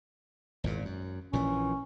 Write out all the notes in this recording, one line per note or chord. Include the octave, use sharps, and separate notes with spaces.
G#1 E2 A#2
F#2
A#1 A#2 E3 C#4